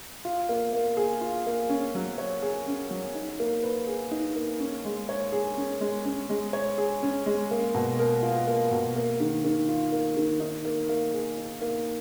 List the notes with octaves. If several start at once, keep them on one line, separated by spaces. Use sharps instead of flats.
F4
A#3
A#3
G#4
F4
A#3
C#4
F#3
C#5
G#4
C#4
F#3
D#4
A#3
B4
G#4
D#4
A#3
C#4
G#3
C#5
G#4
C#4
G#3
C#4
G#3
C#5
G#4
C#4
G#3
A#3
B2
A#4
F4
A#3
B2
A#3
D#3
D#3
F4
A#3
D#3
D#4
A#3
A#3
G#4
D#4
A#3